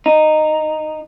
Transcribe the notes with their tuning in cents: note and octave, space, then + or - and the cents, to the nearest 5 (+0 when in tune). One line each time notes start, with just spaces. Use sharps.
D#4 -10